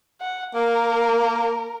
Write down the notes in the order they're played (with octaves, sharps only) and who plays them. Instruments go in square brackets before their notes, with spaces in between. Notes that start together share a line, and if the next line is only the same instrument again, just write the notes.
[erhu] F#5
[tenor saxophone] A#3 [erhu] A#4